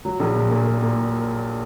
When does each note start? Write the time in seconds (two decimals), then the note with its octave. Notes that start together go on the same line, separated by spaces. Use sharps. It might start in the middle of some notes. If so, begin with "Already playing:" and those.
0.05 F#3
0.20 A#1
0.35 A#2
0.51 A#2
0.66 A#3
0.82 A#2